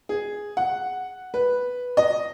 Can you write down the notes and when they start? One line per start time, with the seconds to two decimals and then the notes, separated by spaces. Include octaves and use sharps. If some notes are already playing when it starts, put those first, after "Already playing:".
0.09 G#4
0.57 F#5
1.34 B4
1.97 D#5